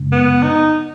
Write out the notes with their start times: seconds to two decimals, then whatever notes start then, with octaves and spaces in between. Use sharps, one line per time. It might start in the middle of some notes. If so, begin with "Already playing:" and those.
Already playing: F#2 C#3 G#3
0.12 B3
0.42 D#4